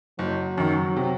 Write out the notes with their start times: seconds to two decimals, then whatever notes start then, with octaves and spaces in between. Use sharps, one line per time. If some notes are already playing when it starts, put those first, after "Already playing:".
0.19 F#1 F#3
0.58 F#2 D#3
0.96 C3